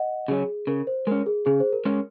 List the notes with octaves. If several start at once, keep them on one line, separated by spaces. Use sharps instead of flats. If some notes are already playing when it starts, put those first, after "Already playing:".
Already playing: D#5 F#5
C#3 F#3 C#4 G#4
C#3 A#4
C5
G#3 C#4 A#4
G#4
C#3 G#4
C5
A#4
G#3 C#4